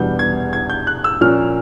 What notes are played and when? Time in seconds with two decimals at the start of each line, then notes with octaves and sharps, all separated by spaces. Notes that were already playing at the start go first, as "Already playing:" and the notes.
Already playing: E2 B2 G3 B3 D4 G6
0.19 G#6
0.53 G#6
0.70 G6
0.87 F#6
1.04 E6
1.21 A#2 F3 A#3 C#4 F6